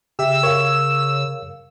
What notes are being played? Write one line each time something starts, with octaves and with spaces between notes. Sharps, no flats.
C#3 G4 E5 E6
A#4 C#5 F5